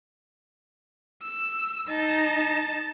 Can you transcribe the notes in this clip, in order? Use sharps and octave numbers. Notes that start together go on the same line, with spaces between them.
E6
D#4 A5